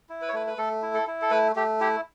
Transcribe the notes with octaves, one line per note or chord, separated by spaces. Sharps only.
E4
B4
C#5
A3 B4
B4
A3 A4
E4
A4
E4
A4
A3 B4
A3 G4
E4 G4